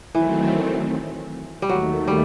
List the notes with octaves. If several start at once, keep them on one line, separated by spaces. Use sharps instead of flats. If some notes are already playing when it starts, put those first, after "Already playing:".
D#3 E3 F#3 A3 C4
G3
D#2 D#3 F#3 A3
G3